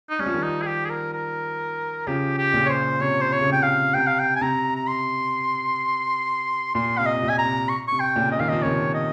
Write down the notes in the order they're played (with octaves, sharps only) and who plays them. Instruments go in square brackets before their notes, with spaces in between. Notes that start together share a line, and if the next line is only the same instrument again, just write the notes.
[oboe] D#4
[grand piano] G3 [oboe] C#4
[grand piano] F3
D#3 G3
[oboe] D#4
G#4
G4
G#4
A#4
A#4
[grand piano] C#3 F3 [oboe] G4
[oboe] G4
[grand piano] A#2 C#3
[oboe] C#5
C5
[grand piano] C3 [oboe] C#5
[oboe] C5
C#5
[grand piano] C#3
C3
[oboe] G5
F5
[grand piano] C3 [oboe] G5
[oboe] F5
G5
G#5
[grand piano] C3 [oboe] A#5
[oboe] A#5
C6
[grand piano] A#2 [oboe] C6
[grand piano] C3 [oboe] F5
[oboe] D#5
[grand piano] C3
A#2
[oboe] G#5
A#5
[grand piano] C3
[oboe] C#6
[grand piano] C3 [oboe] C#6
[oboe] G5
[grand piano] A#2 C#3
[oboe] D#5
[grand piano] D#3 [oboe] F5
[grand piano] F3 [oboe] D#5
[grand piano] C3 D#3 [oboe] C#5
[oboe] D#5